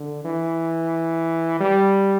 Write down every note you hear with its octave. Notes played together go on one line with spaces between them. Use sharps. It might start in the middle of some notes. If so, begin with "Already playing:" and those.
Already playing: D3
E3
G3